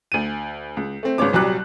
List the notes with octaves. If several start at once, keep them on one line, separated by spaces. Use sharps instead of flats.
D2 D#7
C#2
A3 C4
G#1 C#3 B3 C#5 D6
D#1 C2 F#3 G3 D6 F#6